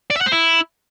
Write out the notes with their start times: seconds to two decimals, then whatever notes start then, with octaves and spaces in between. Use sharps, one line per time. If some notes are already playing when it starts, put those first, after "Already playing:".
0.10 D5
0.16 E5
0.21 F#5
0.26 C5
0.32 E4